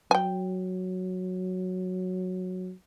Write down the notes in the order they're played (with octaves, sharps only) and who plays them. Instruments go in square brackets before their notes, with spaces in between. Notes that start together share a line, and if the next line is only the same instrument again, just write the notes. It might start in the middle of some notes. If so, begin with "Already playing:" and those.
[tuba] F#3 [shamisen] G5 G#5